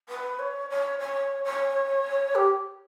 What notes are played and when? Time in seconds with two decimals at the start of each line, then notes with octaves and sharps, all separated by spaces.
0.09 B4
0.39 C#5
0.70 C#5
0.99 C#5
1.44 C#5
2.35 G4